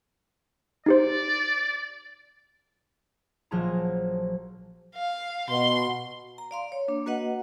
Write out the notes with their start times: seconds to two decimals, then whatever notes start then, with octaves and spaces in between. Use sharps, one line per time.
0.86 D#4 G4 C5 D5
3.51 A#1 F3 F#3 G#4 A5 A#5
4.95 F5
5.50 B2 C6
6.38 A#5
6.51 D5 F5 C6
6.72 C#5
6.88 A#3 D4
7.06 A#3 F#4 B4 D#5 F#5